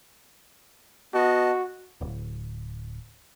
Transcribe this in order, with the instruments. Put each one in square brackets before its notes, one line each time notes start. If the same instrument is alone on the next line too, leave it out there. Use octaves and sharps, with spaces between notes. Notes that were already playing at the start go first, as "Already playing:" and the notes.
[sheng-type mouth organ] B3 D#5 A5 [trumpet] F#4
[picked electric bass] D1